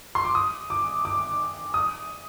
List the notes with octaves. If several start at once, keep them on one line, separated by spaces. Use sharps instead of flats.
C6
D6
D#6
D6
D6
D#6